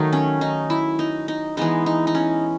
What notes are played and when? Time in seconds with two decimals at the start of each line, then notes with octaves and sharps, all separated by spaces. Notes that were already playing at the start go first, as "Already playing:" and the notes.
Already playing: D#3 F#3 A3 D#4
0.13 C#4
0.41 D#4
0.70 E4
0.99 D#4
1.28 D#4
1.57 E3 G#3 B3 D#4
1.86 D#4
2.07 D#4
2.15 C#4